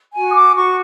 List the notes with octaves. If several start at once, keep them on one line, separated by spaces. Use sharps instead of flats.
F#4 G#5
D#6
D6
F#4 C#6